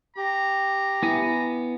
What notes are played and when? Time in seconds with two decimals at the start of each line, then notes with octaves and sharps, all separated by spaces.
0.17 G4 A#5
1.03 B3 E4 G#5